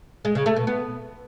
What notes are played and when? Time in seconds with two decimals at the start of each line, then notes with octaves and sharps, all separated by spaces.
0.25 G#3
0.35 C#3
0.46 A3
0.56 B2
0.67 B3